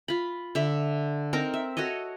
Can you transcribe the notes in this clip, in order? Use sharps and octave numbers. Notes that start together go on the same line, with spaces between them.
F4 B5
D3 E5
C4 D#4 A#4 A#5
E5
F#4 A4 C#5 D#5